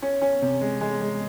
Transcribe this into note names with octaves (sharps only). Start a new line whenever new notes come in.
C#4
C#4
C3
G#3
G#3
G#3